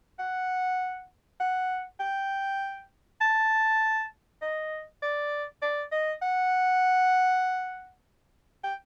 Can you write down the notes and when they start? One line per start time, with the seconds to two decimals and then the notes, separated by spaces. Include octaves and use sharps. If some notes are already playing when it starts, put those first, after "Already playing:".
0.19 F#5
1.40 F#5
2.00 G5
3.21 A5
4.42 D#5
5.02 D5
5.62 D5
5.92 D#5
6.22 F#5
8.64 G5